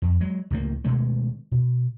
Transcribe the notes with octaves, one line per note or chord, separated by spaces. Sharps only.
F2
F#3 G#3
C#2 A2 D#3 A#3
B2 D#3 G#3 A3
B2